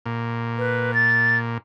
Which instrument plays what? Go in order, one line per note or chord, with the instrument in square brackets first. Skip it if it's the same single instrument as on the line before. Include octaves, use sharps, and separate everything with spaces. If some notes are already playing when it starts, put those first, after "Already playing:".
[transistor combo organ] A#2
[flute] B4
A6